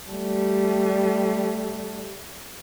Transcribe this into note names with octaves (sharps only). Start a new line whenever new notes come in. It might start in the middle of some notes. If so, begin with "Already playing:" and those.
G3 A3